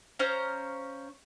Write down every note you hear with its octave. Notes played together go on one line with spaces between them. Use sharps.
C#4 C5 F5 A#5